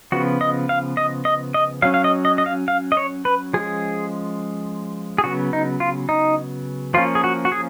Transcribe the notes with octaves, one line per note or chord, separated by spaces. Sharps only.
C#3 F3 B3 F#4
D#5
F5
D#5
D#5
D#5
F#3 C#4 F5
F5
D#5
D#5
D#5
F5
F5
D#5
C#5
B4
F3 G#3 C#4 G#4
G#4
C#3 F#3 B3 F#4
D#4
F4
D#4
F3 A#3 C#4 F4
G#4
F#4
F#4
G#4